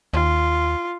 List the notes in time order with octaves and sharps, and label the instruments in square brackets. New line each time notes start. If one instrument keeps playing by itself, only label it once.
[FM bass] D#2 [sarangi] F4